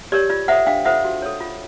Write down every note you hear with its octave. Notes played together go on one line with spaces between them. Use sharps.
G4 A#4 C#5 D5
F4 D5
A4 C5 E5 F#5
D4 F5 G5
F4 A4 C5 E5 F#5
F#4
A4 C#5
F4